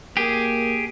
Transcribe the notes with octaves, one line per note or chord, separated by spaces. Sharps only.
A#3 G4 G#4